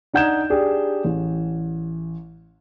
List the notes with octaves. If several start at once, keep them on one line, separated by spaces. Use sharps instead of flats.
D4 D#4 F#5 G6 G#6 E7
D4 G4 G#4
A1